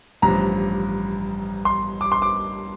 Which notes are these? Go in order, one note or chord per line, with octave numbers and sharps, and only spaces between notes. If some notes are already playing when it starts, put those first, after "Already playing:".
A1 G2 F3 A#5
C6
D6
C6
D6